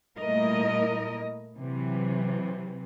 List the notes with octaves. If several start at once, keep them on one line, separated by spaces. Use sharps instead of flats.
A#2 G3 A3 E4 A#4 D#5
C3 E3 F#3